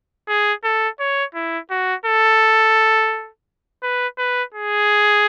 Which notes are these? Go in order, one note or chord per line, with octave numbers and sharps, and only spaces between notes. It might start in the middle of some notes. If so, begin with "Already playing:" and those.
G#4
A4
C#5
E4
F#4
A4
B4
B4
G#4